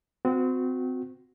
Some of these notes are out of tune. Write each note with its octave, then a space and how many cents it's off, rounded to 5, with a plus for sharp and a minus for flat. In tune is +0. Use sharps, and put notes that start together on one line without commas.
C4 -30 F#4 -25